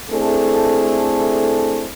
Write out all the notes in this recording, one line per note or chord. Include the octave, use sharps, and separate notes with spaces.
A3 C4 D4 E4 G#4 A4